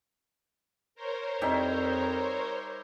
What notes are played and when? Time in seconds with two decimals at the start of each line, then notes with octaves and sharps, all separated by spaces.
0.95 A#4 C5 C#5
1.42 F2 G3 D#4 E4